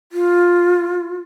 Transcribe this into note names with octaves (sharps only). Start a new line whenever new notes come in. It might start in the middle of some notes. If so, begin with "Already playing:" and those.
F4